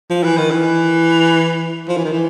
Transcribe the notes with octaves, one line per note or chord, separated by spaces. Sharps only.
F3
E3
D#3
E3
F3
E3
D#3
E3